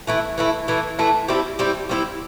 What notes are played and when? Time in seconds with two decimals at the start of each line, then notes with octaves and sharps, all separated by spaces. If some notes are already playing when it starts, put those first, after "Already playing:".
0.07 E3 A3 E4
0.38 E3 A3 E4
0.68 E3 A3 E4
0.99 E3 A3 E4
1.28 G3 C4 E4 G4
1.59 G3 C4 E4 G4
1.89 G3 C4 E4 G4